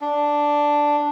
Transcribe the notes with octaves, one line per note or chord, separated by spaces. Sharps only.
D4